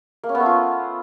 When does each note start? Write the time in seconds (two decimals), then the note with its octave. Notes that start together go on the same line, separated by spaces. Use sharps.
0.23 A#3
0.29 C#4
0.35 B3
0.40 A3
0.46 F4